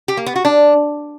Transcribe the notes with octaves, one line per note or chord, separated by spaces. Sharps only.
G4
A#3
B3
F#4
D4